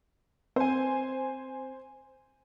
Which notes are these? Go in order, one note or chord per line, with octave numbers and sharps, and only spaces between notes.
C4 C5 G#5